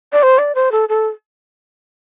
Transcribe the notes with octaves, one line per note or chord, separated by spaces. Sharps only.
D5
C5
D5
C5
A4
A4